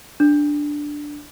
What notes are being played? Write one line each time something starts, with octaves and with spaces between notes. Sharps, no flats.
D4